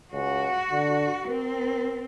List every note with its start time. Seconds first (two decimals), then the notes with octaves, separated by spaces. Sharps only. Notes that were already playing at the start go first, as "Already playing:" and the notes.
0.13 C#2 F#4
0.71 D3
1.29 C4 A#4